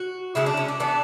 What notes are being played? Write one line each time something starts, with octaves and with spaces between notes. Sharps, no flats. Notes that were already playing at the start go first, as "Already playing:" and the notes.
Already playing: F#4
C#3 G#3 C#4 E4
D4
C#4
D4
E3 B3 D4